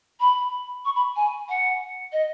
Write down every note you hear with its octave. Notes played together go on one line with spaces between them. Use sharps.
B5
C#6
B5
G#5
F#5
D#5